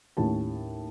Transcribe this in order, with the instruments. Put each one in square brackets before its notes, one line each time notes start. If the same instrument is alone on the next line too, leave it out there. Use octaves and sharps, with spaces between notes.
[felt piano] D#2 A2 C#4 G4 A5